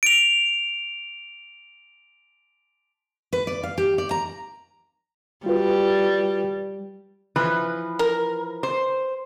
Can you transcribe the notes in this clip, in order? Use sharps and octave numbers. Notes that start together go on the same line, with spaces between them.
D7 F7
B4
D5
F5
G4
D5
A#5
G3 F4 F#4 B4
E3 F3 B4
A#4
C5